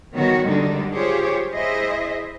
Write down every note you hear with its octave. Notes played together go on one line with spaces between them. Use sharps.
D#3 G3 B3 F#4 C#5
D3 D#3 G3 G#3 D4 D#4
F4 G4 G#4 C5 C#5
E4 G#4 C5 D#5 E5